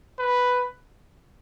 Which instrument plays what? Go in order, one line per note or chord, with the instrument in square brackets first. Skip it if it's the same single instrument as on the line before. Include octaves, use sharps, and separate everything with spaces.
[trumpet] B4